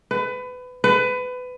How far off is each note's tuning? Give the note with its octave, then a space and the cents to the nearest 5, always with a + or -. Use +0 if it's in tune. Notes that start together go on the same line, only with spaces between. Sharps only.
B4 +25
B4 +25